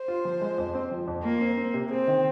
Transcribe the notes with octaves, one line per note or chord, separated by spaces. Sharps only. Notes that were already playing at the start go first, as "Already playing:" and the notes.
Already playing: C5
F4
F3
G#3
F2
C4
F3
F2
A#3 F4
C4
C4
C3
C4 G#4
D#3